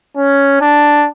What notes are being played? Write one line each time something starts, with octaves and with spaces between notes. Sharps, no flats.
C#4
D4